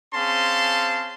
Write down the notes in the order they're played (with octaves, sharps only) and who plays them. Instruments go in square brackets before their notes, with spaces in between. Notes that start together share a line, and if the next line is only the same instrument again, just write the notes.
[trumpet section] C4 C#4 G#4 F5 A5 C6